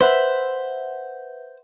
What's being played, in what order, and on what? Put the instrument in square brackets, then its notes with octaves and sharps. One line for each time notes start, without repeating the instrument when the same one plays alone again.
[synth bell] B4 E5 F#5 [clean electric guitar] C5